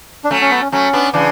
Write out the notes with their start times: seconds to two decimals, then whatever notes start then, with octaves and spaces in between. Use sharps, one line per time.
0.24 D4
0.30 F#3 A3 C#4
0.41 C#4
0.51 B3
0.61 C#4
0.72 F#3 A3 C#4
0.93 B3 D4
1.13 C#3 E3 D4